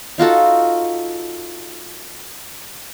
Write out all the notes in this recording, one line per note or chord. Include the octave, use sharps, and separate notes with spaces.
D#4 F4 F#4 A4